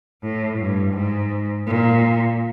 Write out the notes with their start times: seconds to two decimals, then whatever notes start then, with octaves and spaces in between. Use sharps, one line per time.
0.22 A2
0.58 G2
0.94 G#2
1.67 A#2